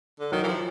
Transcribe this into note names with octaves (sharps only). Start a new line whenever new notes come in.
D3
D#3 F#3
E3
F3